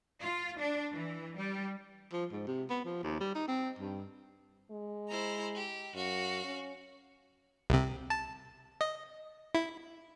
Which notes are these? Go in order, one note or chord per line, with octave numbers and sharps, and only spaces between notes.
F4
D4
E3
G3
F3
G#2
C3
B3
F3
D#2
G3
D#4
C4
G2
G#3
E4 C5 A#5
G4
F#2 F#4 F5
C#4
C2 C3
A5
D#5
E4